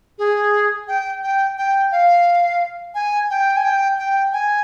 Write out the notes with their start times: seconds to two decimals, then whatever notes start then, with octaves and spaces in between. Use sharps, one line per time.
0.18 G#4
0.88 G5
1.23 G5
1.58 G5
1.92 F5
2.95 G#5
3.30 G5
3.57 G#5
3.64 G5
3.98 G5
4.33 G#5